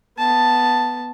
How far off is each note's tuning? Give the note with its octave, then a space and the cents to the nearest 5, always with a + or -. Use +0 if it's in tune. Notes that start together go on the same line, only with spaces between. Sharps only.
B3 +0 A5 +0